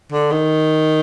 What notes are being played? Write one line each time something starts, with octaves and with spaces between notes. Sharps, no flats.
D3
D#3